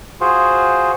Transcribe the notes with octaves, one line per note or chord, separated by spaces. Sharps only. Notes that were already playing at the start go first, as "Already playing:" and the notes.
F4 F#4 G#4 C5